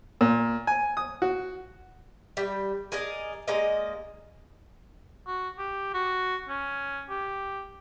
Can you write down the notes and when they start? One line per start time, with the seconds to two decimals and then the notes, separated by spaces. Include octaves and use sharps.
0.21 A#2
0.67 G#5
0.97 D#6
1.22 F#4
2.37 G3 G5
2.92 G#4 A#4 D5 D#5
3.48 G#3 A#3 D5 D#5
5.27 F#4
5.59 G4
5.94 F#4
6.49 C#4
7.09 G4